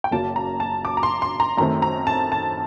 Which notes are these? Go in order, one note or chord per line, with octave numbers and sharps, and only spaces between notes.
G5
F#1 F#2 F#3 A#3 A5
A#5
A5
D6
A#5
C6
C6
A#5
F#2 D#3 A3 C4 A#5
A#5
A5
A5